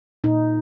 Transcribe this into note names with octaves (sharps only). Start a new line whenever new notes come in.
A#2 D#4